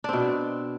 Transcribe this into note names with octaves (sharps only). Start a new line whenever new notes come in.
B2 C4 D4